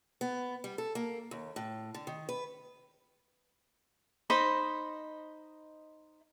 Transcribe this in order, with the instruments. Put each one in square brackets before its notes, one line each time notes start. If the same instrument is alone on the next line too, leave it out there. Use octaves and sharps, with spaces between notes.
[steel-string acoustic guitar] B3
G3
A4
A#3
D#2
A2
D3
D#3
B4
[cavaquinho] D#4 C5 D#5 B5